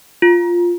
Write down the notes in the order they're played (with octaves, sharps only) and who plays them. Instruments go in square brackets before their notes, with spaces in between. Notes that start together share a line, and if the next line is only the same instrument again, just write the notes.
[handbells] F4